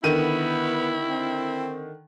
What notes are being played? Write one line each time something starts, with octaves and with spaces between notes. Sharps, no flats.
D3 D#3 B3 E4 D#7
C4